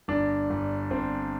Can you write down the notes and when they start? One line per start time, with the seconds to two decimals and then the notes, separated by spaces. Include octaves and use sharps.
0.08 G1 D4
0.50 G1
0.90 G1 C4